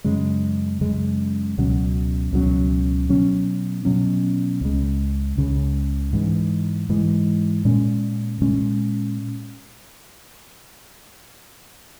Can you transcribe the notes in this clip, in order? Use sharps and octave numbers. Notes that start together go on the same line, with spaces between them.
F#2 C#3 G#3
F#2 C#3 G#3
C#2 B2 F#3 C#4
C#2 B2 F#3 C#4
B2 F#3 C#4
B2 F#3 C#4
C#2 C#3 G#3
C#2 C#3 G#3
G#2 E3 G#3
G#2 E3 G#3
A#2 G#3 C#4
A#2 G#3 C#4